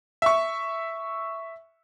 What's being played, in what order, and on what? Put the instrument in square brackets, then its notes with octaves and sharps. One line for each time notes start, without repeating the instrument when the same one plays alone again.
[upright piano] E5 C#6